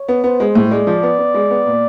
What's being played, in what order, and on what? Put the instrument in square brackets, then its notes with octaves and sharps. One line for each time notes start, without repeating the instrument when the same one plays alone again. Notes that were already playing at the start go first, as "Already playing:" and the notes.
Already playing: [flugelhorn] C#5
[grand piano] B3
[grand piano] B3 [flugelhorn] C5
[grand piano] G#3
A2
[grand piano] G#3 [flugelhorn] D5
[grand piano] F3
B3
B3
G#3
B3
A#2